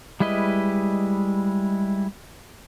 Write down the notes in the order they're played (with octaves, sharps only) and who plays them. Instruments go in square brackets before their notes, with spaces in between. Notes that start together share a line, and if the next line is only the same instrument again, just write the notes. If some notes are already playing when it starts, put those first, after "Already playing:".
[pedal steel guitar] G3 G#3 E4 B4 D#5